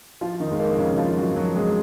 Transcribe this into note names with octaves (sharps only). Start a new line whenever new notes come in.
F3 F4
D#3 D#4
F2
G#3
A#3
F2
C#3 C#4
F3 F4
F#3 F#4
F2
F#3 F#4
F2
G#3 G#4